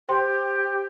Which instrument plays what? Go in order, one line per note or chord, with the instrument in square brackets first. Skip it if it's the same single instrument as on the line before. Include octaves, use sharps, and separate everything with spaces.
[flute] G4 [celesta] C5 G5 C6